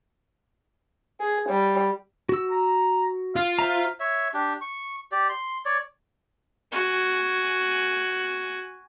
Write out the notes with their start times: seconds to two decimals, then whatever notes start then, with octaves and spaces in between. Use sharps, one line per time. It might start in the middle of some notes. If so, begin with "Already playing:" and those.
1.20 G#4
1.49 G3
2.29 F#4 E6
2.51 A#5
3.36 F4 F5
3.59 C5 E5 A#5
4.00 C#5 E5
4.34 D4 G4
4.61 C#6
5.12 G4 D5
5.29 C6
5.65 C#5 D5
6.72 F#4 G#5